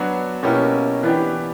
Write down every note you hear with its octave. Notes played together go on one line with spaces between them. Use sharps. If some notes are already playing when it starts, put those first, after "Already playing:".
Already playing: F#3 B3 D4 F#4
B2 A#3 C#4 E4 G4
E3 B3 D4 G4